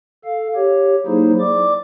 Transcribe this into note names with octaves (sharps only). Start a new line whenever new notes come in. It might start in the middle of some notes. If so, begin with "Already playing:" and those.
A4 F5
G4 C#5
F#3 A#3 D#4 E4 G#4 C5
D5 D6